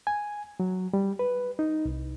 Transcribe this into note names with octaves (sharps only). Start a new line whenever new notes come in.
G#5
F#3
G3
B4
D#4
C2